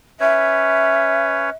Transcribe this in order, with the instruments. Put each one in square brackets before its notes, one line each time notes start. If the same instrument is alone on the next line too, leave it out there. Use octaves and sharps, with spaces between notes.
[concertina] C#4 B4 C#5 [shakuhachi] E5